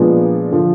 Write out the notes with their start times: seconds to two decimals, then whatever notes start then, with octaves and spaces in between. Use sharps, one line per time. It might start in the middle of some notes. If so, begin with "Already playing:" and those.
Already playing: A#2 F3 G#3 B3 D4
0.52 D3 F3